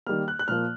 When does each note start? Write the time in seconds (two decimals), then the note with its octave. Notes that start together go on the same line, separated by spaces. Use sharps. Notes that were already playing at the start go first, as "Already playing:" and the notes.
0.07 D#3 G3 A#3 F6
0.28 F#6
0.39 F#6
0.48 A#2 F3 A#3 F6